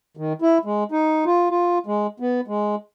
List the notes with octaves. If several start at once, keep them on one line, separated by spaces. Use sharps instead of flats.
D#3
E4
G#3
D#4
F4
F4
G#3
B3
G#3